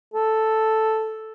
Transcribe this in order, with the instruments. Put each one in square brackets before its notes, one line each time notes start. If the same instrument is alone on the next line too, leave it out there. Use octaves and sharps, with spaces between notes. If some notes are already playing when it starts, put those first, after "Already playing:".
[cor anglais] A4